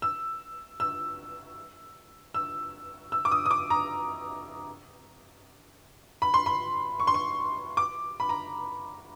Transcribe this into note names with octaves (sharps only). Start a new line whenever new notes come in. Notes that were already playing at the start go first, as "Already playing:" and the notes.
E6
E6
E6
E6
D6
D#6
D#6
D6
A#5
B5
C6
B5
C#6
C6
C#6
D6
B5
A#5